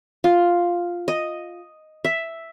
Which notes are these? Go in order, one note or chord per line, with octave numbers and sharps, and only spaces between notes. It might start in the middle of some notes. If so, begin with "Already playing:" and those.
F4
D#5
E5